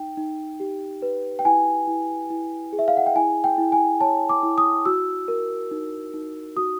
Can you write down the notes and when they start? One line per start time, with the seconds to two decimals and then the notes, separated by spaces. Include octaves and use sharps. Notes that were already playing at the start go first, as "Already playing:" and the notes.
Already playing: D#4 G5
0.17 D#4
0.60 G4
1.02 B4
1.39 G5
1.45 E4 G#5
1.87 E4
2.30 E4
2.73 G#4
2.79 E5
2.88 F5
2.97 F#5
3.06 G5
3.15 E4 G#5
3.44 G5
3.58 E4
3.72 G#5
4.01 C#5 A5
4.29 D6
4.43 E4
4.58 D#6
4.85 F#4 E6
5.28 A#4
5.71 D#4
6.14 D#4
6.57 F#4 D#6